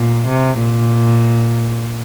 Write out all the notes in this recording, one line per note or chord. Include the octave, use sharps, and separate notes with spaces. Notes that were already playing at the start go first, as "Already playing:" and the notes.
Already playing: A#2
C3
A#2